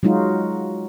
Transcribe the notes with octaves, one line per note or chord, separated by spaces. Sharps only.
F#3 G#3 D#4 F4 F#4